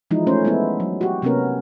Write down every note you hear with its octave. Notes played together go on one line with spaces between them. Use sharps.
E3 F3 G#3 D#4 E4
A3 C#4 C5
G#3 B3 E4
F#3
F#4 G4
C3 A#3 B3 C#4 A#4